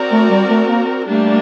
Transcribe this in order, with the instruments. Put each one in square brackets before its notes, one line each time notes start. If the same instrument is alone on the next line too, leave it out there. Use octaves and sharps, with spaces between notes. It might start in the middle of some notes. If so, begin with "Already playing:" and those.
Already playing: [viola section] C4 F#4 A#4 D5
[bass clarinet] A3
G3
A3
A#3
[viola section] G3 A#3 D4 [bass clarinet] A3